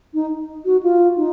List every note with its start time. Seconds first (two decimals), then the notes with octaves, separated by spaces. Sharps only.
0.14 D#4
0.65 F#4
0.83 F4
1.17 D#4